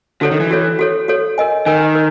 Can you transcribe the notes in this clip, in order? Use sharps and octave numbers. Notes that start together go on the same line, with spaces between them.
D3 F#4 A4 C#5
D#3
E3
F#4 A4 C#5
F#4 A4 C#5
F#4 A4 C#5
A#4 D#5 G#5
D#3 A#4 D#5 G#5
A#4